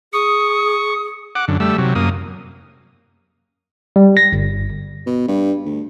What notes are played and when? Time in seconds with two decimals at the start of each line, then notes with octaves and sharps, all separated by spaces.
0.13 G#4 C#6 D#6
1.35 F#5 D6
1.48 F#2 D3
1.60 G3 A3 E6
1.78 C3 F#3
1.95 F#2 A#3 D#6
3.96 G3
4.17 A#6
4.32 G1
5.06 B2
5.28 G2
5.65 D2